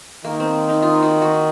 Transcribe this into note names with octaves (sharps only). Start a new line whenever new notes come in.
D#3 A#3
C4
D#4
F4
F#4
F#4